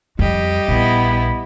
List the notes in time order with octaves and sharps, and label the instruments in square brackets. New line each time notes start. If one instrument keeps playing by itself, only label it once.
[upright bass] F2 [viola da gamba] G3 G4 D#5
[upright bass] A#1 [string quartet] B3 E4